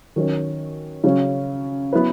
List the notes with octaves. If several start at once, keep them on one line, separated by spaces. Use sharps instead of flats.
D#3 F#3 C#4
C#3 F#3 C#4
F#3 B3 E4 B4